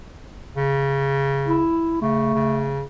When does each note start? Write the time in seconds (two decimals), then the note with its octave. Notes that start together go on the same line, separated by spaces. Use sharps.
0.57 C#3
1.47 E4
2.02 C#3 A3
2.34 C#3